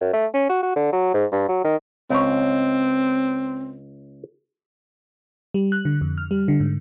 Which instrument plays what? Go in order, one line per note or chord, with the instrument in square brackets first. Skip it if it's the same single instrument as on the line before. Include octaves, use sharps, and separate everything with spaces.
[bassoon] F#2
A3
C#4
F#4
F#4
D3
F#3
G#2
G2
F#3
D#3
[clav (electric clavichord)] C#2 C#5 [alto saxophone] C4
[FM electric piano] G3
F#6
D3
F2
F6
G3
D3
G#2